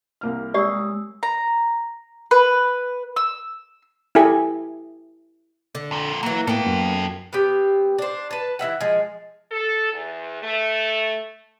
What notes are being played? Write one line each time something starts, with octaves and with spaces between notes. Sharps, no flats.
C2 A#3 F6
G#3 G4 C#5 D5 D#6 E6
A#5
B4
E6
E4 G4 A4 G#5
D3
F2 A#2
E3 F#3 A#3 F#4
A2 A#3 B3 A4 G5
F#2
B3 C4 G4
D4 C5
B4 A5
E3 E4 E5 F#5
F3 G#3
A4
E2
A3